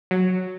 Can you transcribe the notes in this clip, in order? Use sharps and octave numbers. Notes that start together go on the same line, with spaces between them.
F#3